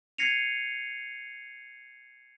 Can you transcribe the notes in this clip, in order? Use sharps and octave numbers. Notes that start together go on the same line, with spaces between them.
G#6 A#6 C7 C#7 D#7 F7